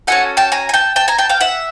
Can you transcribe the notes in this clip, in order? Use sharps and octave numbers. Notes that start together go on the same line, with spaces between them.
C#4 F#4 A4 F#5 G#5
G5 A5
G#5 A#5
G#5
G5 A5
G5 A5
G#5 A#5
G5 A5
F5 G5
E5 F#5